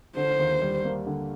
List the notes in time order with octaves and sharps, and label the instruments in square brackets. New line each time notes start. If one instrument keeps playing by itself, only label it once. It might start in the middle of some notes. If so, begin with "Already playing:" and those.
[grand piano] D3 [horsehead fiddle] C5
[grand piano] D#2
G3
A#3
D3